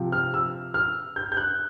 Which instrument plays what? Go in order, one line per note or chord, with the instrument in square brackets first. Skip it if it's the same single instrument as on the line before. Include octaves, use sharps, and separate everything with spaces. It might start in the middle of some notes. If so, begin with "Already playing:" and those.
Already playing: [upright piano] C3 F3
F6
E6
F6
G6
G6
F#6